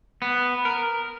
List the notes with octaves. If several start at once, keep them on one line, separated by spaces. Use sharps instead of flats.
B3
A#4